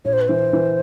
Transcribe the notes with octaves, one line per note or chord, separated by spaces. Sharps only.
A#1 C#5
C5
B4
E3 C5
E3